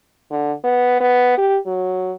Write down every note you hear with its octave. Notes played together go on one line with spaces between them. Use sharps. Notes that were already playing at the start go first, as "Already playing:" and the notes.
D3
B3
B3
G4
F#3